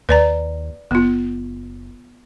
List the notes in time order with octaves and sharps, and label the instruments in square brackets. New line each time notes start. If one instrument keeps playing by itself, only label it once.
[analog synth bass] D#2 [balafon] B4 D5 A#5
[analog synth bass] F#1 [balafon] B3 F4